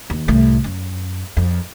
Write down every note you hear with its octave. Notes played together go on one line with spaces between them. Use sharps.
D#2
C2 A2
F#2
F2